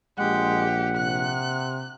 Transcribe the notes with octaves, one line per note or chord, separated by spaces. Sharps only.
A#1 G#3 G4 F#5
C3 F#6